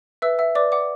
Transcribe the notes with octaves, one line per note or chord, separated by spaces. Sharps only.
B4 E5 E6
E5 F#5 E6
B4 D5 D6
D5 F#5 D6